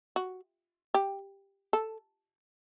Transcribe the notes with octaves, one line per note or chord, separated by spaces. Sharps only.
F#4
G4
A4